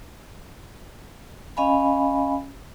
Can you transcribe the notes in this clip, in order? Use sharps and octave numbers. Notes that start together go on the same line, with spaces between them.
C#4 D#5 F5 G#5 B5